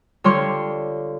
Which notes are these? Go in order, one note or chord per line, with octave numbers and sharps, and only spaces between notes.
D3 G3 F4 C#5 C6 C#6